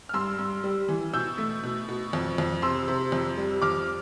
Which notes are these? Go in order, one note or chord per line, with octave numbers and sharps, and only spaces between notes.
F6
G2 C6 E6
G2
G3
E3
B2 E6 G6
A3
B2
B2
F2
F2
C3 C6 E6
C3
F2
G3
F2 D6 F6